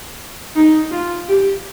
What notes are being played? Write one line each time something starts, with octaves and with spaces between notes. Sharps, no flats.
D#4
F4
G4